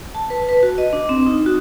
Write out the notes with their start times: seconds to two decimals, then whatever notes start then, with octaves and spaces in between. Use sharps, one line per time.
0.15 A5
0.30 B4
0.49 B4
0.63 F#4
0.78 D#5
0.93 D4
1.09 C4
1.26 D#4
1.46 F#4